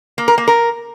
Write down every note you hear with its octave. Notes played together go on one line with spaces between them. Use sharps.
A#3
A#4
A#3
A#4